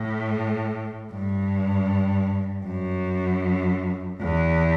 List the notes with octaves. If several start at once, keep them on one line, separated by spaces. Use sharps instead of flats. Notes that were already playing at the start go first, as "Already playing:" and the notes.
Already playing: A2
G2
F#2
E2